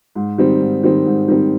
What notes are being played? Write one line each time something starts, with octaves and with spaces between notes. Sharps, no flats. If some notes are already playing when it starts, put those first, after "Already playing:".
G#2
D#3 G3 C4
G#2
D#3 G3 C4
G#2
D#3 G3 C4